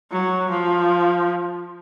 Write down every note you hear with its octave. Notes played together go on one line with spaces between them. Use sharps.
F#3
F3